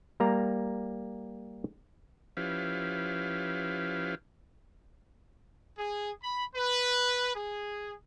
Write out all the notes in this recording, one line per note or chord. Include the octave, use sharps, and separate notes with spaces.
G3 A#3 A#5
F3 C#4 E4 G4 B4 F5
G#4
B5
B4
G#4